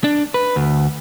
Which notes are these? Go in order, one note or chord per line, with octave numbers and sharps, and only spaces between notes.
D4
B4
D2